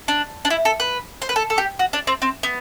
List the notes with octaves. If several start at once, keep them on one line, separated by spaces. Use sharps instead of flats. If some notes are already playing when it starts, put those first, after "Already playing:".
D4
D4
E4
A4
B4
C5
B4
A4
A4
G4
F#4
D4
C4
C4
B3